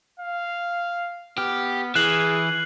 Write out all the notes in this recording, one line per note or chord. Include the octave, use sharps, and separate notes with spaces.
F5
B3 G4 F6
E3 G#4 F#6 C7 F#7